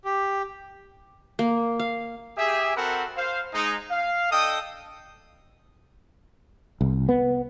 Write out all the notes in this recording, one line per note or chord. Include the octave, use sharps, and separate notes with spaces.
G4
A#3
F5
G4 G#4 E5
C4 F#4 A4 A#4 F#5 B5
C5 F5
G#3 D#4
F5
D4 A4 D#5 G5 D#6
C2
B3